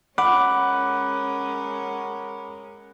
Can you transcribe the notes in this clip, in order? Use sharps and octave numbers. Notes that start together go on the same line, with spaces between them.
G#3 C#4 A#4 F#5 B5 D6